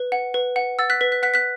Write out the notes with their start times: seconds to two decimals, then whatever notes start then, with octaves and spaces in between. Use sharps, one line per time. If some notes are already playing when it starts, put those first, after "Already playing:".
Already playing: B4
0.12 F#5
0.34 B4
0.56 F#5
0.79 F#5 E6 A6
0.90 F#6 B6
1.01 B4 F#6 B6
1.12 F#6 B6
1.23 F#5 F#6 B6
1.34 F#6 B6